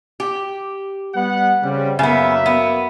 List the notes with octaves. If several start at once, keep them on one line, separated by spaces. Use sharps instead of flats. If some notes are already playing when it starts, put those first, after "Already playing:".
G4
G3 B3 F#5
C#3 G3 C4
F#2 C#3 A#3 B3 E5
B3